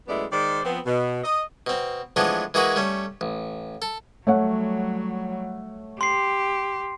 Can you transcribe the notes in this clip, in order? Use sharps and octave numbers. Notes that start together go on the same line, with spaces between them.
F#2 G#3 A3 B3 E4 D5
D#3 G#3 C5 D5
F3 B3 C4
B2
D#5
B2 C4
E3 F3 G#3 A3 B3 D4
E3 G#3 A#3 F#4 G#4 B4
G3 A3 C#4
A1
A4
F#3 G3 A3 C#5 F#5
G4 C6 C7